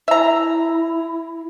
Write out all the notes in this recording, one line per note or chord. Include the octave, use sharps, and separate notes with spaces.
E4 E5 A#5